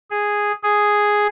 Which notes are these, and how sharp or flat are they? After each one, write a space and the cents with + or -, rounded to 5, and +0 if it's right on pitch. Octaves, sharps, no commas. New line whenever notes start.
G#4 -5
G#4 +0